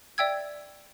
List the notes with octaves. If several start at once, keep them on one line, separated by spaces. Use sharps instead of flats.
D5 E5 G5 E6 G#6